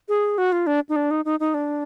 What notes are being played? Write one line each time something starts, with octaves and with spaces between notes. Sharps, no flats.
G#4
F#4
F4
D4
D#4
D4
D#4
D#4
D#4
D4